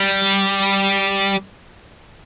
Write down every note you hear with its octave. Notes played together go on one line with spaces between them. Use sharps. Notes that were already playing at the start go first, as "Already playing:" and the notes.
Already playing: G3